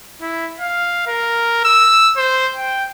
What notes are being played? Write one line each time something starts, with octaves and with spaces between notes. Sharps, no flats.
E4
F5
A#4
E6
C5
G5